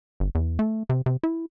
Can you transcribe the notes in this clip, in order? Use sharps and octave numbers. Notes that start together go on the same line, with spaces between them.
G1
E2
A3
C3
C3
E4